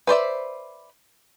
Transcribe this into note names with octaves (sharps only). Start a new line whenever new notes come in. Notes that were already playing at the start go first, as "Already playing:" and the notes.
B4 C5 D5 E5